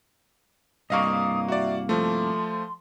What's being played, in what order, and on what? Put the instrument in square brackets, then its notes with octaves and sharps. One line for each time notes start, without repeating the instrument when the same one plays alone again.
[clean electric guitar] C2 G2 A#3 [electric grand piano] D#5 F5 C#6 [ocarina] D#6
[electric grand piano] F#4 D5 [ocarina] E5
[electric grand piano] F3 A3 [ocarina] C6